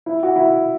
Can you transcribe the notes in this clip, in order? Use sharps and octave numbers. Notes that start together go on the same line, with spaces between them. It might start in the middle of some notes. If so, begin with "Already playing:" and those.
E4
F#4
E4